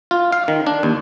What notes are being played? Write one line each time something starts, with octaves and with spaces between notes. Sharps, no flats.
F4
F5
D#3
D4
D#2